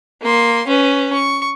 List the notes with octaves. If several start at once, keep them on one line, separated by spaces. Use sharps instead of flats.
A#3 C6
C#4 B4
C#6